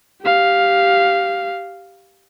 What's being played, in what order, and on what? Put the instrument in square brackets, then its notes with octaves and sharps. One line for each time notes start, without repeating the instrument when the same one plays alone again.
[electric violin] G4 F5